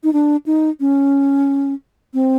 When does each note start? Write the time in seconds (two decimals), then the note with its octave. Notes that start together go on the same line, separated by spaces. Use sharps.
0.04 D#4
0.13 D4
0.46 D#4
0.80 C#4
2.14 C4